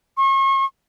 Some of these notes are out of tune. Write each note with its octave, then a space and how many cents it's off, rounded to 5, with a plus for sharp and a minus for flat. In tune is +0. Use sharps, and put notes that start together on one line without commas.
C#6 -40